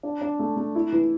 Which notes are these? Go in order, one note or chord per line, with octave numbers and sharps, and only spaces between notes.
D4
D4
A3
A3
E4
E3